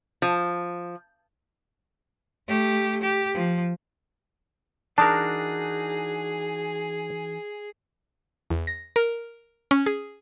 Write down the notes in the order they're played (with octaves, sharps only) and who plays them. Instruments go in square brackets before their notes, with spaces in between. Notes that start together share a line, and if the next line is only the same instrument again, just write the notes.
[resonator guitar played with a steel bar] F3
[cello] A3 G4
G4
F3
[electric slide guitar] E3 D#4 F#4 [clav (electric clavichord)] D4 A#4 [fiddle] G#4 [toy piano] A5 D#6
[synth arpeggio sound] E2
A#6
A#4
C#4
G#4